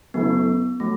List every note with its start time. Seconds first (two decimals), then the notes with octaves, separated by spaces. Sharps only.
0.14 F#1 F#2 F#3 A3 B3 E4
0.80 F#3 A3